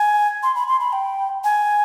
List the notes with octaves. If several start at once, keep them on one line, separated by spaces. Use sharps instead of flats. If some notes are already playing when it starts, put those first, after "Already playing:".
Already playing: G#5
C6
B5
C6
B5
G5
G#5